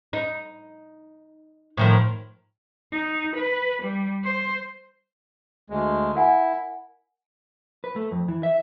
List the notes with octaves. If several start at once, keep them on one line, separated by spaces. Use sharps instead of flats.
D#4
A2 D#3 F3
D#4
B4
G3
C5
D2 G#3
E4 A#4 F#5 G#5
B4
A3
F2
E3
E5